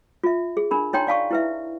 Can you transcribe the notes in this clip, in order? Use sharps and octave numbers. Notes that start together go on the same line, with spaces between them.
F4 E5
G#4
D4 A#4 B5
D4 D#4 C#5 G5 A#5 C6
D5 F5 A5 C#6
E4 B4 E5